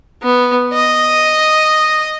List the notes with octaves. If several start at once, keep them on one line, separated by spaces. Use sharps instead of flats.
B3
D#5